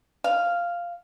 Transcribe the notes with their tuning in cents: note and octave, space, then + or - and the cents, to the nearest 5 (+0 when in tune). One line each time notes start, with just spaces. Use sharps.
F5 -5